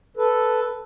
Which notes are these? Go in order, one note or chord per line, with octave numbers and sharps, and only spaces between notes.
A4 B4